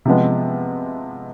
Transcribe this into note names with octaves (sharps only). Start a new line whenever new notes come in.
C3 F3 G#3 B3